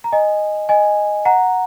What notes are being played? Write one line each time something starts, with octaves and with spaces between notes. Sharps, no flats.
A#5
D#5 G#5
D#5 G#5
F#5 A#5